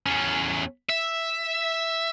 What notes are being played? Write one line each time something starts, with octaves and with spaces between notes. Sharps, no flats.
E2 C#4
E5